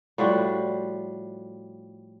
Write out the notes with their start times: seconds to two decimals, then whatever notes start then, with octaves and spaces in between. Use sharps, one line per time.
0.18 A2 F3 G3 F#4